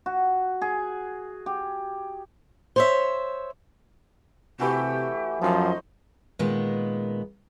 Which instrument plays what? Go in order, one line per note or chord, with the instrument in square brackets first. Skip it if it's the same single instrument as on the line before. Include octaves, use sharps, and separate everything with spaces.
[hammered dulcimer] F#4
G#4
G4
[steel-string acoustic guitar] C5 C#5 E5
[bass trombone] C3 [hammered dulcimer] E3 A3 F#4 [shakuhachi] G4
[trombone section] F#2 F3 [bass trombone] F#3 [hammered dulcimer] D#4 C5 [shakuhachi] D#5
[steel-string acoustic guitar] A#2 D#3 G#3 B3